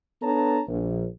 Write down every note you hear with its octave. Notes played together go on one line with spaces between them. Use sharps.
B3 D4 A4 C#5 A5 A#5
A#1